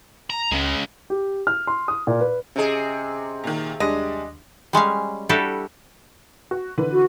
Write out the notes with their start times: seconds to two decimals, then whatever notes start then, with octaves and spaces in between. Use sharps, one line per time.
0.30 A#5
0.51 C#2 C#3 G#3
1.10 G4
1.47 F6
1.67 C6
1.88 D#6
2.07 A#2
2.21 B4
2.56 C3 C#4 G#4 D#5
3.44 A#2 D#3
3.80 D#2 G3 G#3 D4 D#5
4.73 G3 G#3 C#4 F5
5.29 G3 D4 E4 F#4 G4 A4
6.51 F#4
6.78 D3 E3 B4
6.93 F#4